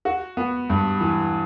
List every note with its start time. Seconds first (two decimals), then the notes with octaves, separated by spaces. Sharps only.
0.05 F#4
0.37 B3
0.70 G2
1.00 E3